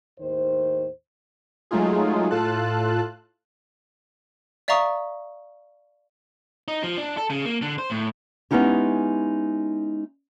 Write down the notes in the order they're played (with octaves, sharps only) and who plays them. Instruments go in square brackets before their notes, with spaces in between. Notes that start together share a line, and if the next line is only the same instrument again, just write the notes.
[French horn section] D#2 A2 D#3 C5
[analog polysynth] F#3 G#3 A3 D#4 F4 G#4
A2 F4 A4 A5 F#6
[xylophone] D5 E5 F5 A#5 C#6 D#6
[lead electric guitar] D#4
F3
D4
A4
C#3
A#3
D3
C5
A2
[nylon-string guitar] G#3 B3 C#4 D#4 E4 G4